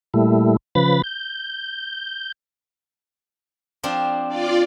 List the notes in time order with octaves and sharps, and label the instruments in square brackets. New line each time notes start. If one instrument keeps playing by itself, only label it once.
[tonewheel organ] A#2 G3 A3 E4
C#3 F3 B4 B5 A6
G6
[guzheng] F3 C4 D4
[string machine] F4 D5